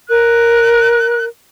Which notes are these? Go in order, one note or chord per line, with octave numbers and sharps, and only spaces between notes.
A#4 F#6